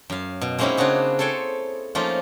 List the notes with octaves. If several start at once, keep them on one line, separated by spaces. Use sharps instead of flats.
F#2 F5
B2
G#3 A#3 C4 C#4 D#4 E4
C#3 C4 D4 F#4 G#4
A4 C5 C#5 G5 G#5
F3 A3 A#3 C#4 D#4 F4